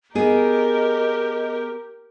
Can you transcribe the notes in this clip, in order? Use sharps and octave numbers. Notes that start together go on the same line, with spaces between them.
B3 G4 G#4 A#4 D#5